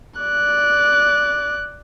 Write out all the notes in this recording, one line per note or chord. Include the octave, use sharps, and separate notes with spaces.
D5 F#6